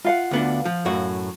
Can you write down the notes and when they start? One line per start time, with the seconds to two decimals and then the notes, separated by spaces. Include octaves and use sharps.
0.05 F4 F5 F#5
0.31 D2 B3 D4
0.65 F3
0.85 F#2 A2 F#4